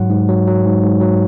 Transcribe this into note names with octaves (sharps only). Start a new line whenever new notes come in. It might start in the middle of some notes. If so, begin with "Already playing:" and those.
Already playing: G#2 F#3 F#5
G#2
F#3
F#3
G#2
G#2
F#3